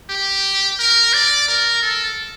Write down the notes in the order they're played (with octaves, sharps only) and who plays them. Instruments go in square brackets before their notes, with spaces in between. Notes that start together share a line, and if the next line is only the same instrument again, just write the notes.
[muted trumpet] G4
A#4
D5
A#4
A4